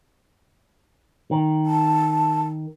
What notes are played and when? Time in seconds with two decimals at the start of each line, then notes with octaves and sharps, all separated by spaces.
1.31 D#3
1.66 A5